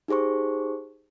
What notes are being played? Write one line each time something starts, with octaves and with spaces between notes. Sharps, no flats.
D#4 G4 G#4 C5 C#6